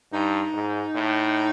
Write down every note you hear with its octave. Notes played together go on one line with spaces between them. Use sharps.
G2 D#4
G#2
A2